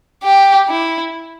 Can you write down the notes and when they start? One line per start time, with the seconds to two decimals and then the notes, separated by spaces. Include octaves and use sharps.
0.23 G4
0.69 E4